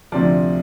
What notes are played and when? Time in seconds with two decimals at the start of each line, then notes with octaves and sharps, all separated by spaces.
0.12 D2 C3 F3 D5